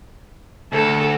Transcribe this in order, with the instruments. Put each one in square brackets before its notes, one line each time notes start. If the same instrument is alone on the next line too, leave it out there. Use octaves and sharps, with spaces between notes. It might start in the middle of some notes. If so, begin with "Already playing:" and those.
[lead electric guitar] D2 [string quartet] A4